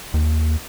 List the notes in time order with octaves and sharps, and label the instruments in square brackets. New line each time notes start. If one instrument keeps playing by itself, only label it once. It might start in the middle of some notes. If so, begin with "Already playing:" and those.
[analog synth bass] D#2